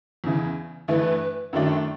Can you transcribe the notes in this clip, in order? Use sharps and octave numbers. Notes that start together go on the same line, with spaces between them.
E2 C#3 E3
G2 E3 A3 B4
F#2 D#3 F#3 A3 D4